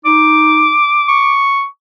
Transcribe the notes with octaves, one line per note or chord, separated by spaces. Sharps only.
D#4 D6
C#6